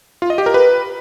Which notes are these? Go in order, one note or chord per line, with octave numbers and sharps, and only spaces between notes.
F4
D#5
G4
A#4
B4